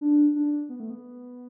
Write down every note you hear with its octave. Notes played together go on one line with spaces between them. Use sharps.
D4
D4
B3
A3
B3